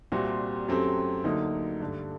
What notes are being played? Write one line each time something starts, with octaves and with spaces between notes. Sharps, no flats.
C2 A#2 G3 C4 F#4
F#2 F#3 A3 C4 G4
D2 D3 F#3 A#3 D#4
G2 D3 A3